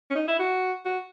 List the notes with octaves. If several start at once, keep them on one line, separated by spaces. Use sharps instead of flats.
C#4
D#4
E4
F#4
F#4